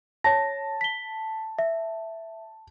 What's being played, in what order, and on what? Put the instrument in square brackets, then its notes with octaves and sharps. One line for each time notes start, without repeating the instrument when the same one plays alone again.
[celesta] C#5 A#6 [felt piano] A5
[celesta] B6 G7
E5